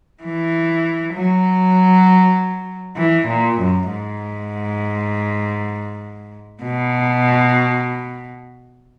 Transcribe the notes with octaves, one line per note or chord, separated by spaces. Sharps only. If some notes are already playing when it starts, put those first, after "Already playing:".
E3
F#3
E3
A#2
F#2
G#2
B2